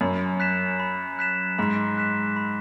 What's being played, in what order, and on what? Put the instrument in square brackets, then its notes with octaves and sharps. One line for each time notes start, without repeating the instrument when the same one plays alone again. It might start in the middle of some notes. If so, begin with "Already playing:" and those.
[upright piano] F#2 [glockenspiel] B5
[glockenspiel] F#6 B6 E7
B5
F#6 B6 E7
[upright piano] G#2 [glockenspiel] B5
[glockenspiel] F#6 B6 E7
B5